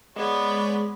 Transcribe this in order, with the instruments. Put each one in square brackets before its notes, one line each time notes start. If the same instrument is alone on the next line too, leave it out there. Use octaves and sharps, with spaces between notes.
[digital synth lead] G#3 [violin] B3 [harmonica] C#5 D5